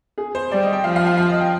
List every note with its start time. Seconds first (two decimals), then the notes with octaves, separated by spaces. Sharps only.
0.18 G#4
0.35 C5
0.51 G3 D5
0.63 D#5
0.73 G5
0.84 F3 F5
0.96 F5
1.07 F5
1.17 F5
1.29 D#5
1.40 G5